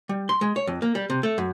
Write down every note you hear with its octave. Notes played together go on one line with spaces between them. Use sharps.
G3
C6
G#3
C#5
F2
A#3
G3
C3
A3
F#2